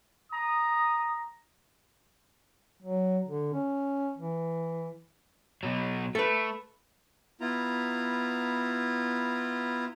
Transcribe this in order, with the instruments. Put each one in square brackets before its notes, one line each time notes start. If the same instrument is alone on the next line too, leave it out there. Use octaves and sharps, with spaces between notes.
[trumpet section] A#5 D#6
[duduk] F#3
D3
C#4
E3
[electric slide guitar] B2 F#3
[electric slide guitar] A3 [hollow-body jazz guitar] A4 B4
[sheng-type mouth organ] B3 E4 F4 A#5